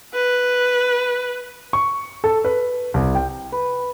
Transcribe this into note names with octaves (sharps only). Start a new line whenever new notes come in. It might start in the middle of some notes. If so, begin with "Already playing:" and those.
B4
C#6
A4
B4
C2
G5
B4